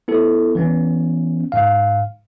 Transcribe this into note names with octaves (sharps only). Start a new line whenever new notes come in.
B3 E4 A4
E3 B3 C#4
G#2 F5